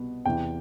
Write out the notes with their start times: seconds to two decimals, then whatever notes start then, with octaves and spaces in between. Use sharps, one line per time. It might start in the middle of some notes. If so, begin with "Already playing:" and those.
Already playing: C2 B2 B3
0.26 E2 C3 E3 G5